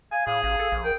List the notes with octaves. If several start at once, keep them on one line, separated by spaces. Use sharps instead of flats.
F5 G#5
A2 G#4 F5
A1 F5
A4
A#1
A#4 G5